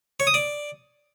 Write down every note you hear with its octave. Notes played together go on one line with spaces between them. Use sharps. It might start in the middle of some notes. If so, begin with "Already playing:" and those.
C#5
D#6
D5